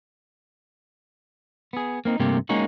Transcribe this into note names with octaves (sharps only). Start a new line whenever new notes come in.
B3 G#4
A#3 C4 D#4
G2 C3 A3 A#3 G4
G#3 A#3 C#4 D#4 F#4